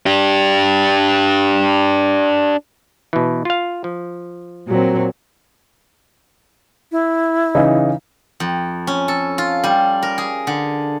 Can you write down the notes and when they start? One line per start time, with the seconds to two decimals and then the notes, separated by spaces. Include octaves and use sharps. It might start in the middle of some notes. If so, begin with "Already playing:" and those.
0.06 D4 G4
3.13 B2 E3
3.45 F4 F5
3.84 F3
4.67 A#2 F#3 C4
6.92 E4
7.55 C#3 E3 D#4
8.40 F2
8.87 C#4
9.08 A4
9.38 F4
9.64 G3
10.03 A#4
10.18 G#4
10.47 D3